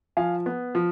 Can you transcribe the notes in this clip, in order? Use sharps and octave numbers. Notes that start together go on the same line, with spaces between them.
F3 F5 G#5
B3
F3